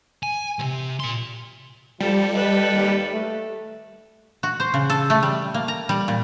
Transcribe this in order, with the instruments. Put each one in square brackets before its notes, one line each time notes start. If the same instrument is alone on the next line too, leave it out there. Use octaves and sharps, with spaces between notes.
[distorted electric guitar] G#5
C#2 C3
A#2 C6
[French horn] F3 [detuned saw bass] G3 [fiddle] A4
[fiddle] A4 B4 [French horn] D#5
[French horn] D#2
A3
[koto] F#4
C5
C#3
A4
A3
G3
A#3
A#5
G3
A#2